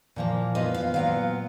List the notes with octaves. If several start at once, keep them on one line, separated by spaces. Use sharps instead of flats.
A#2 F3 A#3
F3 B3 F4 D#5
F5
A#2 F#3 B3 F4 F5